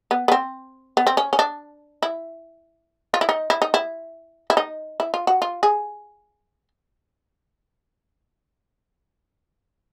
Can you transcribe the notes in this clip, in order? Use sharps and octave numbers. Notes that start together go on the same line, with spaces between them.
B3
B3
C4
B3
C4
C#4
C#4
D4
E4
F4
E4
D#4
E4
D#4
E4
E4
D#4
E4
F4
F#4
F4
G#4